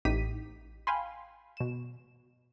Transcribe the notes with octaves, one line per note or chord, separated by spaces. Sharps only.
A1 A2 D#4 G4 B6 D#7
F5 G5 G#5 B5 C6
B2 E7